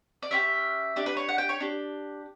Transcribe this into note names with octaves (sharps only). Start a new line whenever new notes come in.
D5
C#4 E4 G4 E5
D4 G4 D5
B4
C#5
F#5
G5
C#5
D4 G4